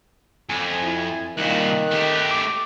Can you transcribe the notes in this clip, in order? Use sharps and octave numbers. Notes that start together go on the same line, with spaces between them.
F2 G#5
E4
C2 A#2 D#3 F#6
A3 G4
D6